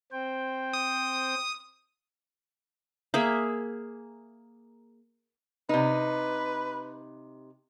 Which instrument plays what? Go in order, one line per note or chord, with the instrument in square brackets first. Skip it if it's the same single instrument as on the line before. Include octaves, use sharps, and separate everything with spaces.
[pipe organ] C4 C5 G5
[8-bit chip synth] D#6
[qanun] A#3 G#4 E5
[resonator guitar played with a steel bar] C3 D#4 [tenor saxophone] B4